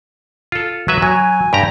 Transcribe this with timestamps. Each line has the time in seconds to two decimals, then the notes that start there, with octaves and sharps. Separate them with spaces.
0.52 F4 A4
0.88 F#3 B4 E5
1.02 F#3 G#5
1.53 G2 G4 A#5